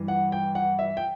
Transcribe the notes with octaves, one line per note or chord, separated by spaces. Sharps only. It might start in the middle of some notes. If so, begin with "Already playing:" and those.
Already playing: G2 E3
F#5
G5
F#5
E5
G5